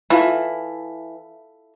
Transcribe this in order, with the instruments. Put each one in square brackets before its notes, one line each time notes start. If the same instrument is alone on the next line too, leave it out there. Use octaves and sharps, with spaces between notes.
[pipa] E3 [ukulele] E4 F4 A4